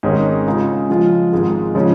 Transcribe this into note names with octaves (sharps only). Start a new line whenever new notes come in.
G#1 G#2 D#3 C#4 G#4
C#3 G#3 F4 G#4
C#3 F3 G#3 F4
G#1 G#2 G#3 F4 G#4
C#3 F3 G#3 C#4